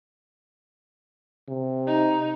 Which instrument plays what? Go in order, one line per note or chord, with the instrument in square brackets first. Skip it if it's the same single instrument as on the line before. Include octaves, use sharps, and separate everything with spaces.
[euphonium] C3
[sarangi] D#4